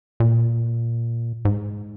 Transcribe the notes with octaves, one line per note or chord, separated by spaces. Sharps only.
A#2
G#2